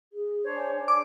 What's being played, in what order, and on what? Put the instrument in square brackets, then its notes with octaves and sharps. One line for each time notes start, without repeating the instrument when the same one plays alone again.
[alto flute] G#4
[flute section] D4 C5 C#5
[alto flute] G#5
[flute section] D4 [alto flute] G#5
[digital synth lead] D6